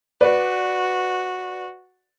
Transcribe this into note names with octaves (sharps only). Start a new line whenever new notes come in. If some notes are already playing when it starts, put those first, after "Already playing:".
F#4 B4 D5